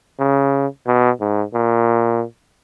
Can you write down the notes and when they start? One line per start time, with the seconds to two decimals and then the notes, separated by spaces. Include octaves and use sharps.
0.20 C#3
0.87 B2
1.20 G#2
1.54 A#2